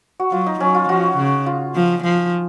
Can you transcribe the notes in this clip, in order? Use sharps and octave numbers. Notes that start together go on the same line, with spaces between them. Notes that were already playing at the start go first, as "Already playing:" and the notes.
F#4
F#3 F4
D#4
F#3 C#4
F4
F3 F#4
C#3
F4
F3
F3